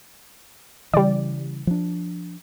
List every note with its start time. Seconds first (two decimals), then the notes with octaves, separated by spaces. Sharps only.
0.94 C#3 E3 G3 D5
1.67 F3 D4